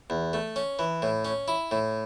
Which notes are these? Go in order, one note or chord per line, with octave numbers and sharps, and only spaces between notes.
E2
A3
C#4
E3
A2
C#4
E4
A2